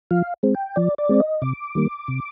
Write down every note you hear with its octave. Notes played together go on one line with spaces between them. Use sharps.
F3 F5
G#3 C4
G5
F3 D5
D5
G#3 C4
D#5
C3 D6
D#3 G3 A#3
C3